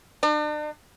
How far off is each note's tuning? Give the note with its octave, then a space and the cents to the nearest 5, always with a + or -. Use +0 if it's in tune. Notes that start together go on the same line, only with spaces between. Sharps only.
D4 +40